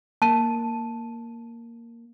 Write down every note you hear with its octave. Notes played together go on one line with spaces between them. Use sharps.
A#3 A5 D#7